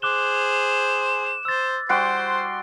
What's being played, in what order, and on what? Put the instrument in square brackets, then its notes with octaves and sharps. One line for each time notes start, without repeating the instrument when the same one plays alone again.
[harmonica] G#4 C5 [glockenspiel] D6 F#6 G7 [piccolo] E7
[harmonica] C5 [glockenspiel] E6 A6
[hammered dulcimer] G3 F#4 F#5 [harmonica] C5 [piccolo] C6 [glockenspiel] C7 D7